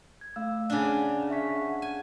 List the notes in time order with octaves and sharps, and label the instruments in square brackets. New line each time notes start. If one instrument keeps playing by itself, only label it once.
[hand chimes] G#6
A3 F5 E6
[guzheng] C#3 D4 [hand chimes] F#5 G#5
[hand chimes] E5 C#6 B6
F#5
[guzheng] G#5